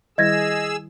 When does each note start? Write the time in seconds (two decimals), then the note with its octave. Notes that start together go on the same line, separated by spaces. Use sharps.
0.18 D#3 G3 E4 G#4 D#5 E6 G#6 A#6